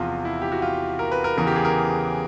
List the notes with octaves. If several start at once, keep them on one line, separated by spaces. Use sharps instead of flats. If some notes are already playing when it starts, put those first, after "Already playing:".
Already playing: E2 C3 F3 F4
E4
G4
F#4
F4
A#4
B4
A#4
E2 C#3 E3 A#4
G4
G#4
A#4